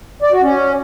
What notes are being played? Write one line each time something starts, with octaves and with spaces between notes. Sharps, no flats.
D5
F#4
C#4